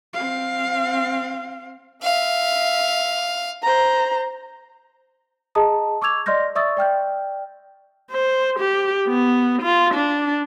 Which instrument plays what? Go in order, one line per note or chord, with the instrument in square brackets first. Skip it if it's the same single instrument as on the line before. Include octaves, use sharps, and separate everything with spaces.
[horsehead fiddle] C4 F5
[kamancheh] E5 [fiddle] F5
[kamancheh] C5 A#5
[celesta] G#4 D#5 A5 A#5 D#6
C#6 D6 E6 G#6 F7
D5 D#5 C6 F6 G6 A#6
D5 E5 C#6 D#6 E6 A6
D5 G5 F6 G6
[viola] C5
G4
B3
F4
D4